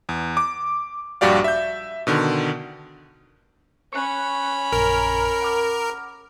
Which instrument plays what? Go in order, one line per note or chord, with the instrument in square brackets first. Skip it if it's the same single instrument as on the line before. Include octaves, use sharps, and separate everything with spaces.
[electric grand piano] E2
D6
A#1 G2 F#4 G4 D5 F5
E5 G6
B2 D3 D#3
[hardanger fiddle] C#4 B5 [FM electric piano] C#6 F#6
[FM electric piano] A#1 F#2 [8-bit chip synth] A#4
[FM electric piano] F#5 D6 F6